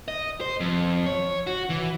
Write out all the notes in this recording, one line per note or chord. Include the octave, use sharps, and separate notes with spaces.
D#5
C5
F2
C#5
F#4
E3